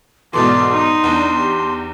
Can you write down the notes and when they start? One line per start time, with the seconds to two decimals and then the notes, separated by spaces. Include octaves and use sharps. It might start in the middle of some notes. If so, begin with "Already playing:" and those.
0.33 G#2 B2 E3 A4 D5 C6
0.72 D#4
1.04 E2 D4
1.37 G4